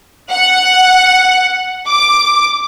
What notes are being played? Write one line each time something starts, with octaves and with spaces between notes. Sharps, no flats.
F#5
D6